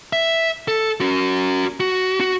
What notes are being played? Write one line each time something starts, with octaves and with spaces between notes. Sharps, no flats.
E5
A4
C#4 F#4
F#4
F#4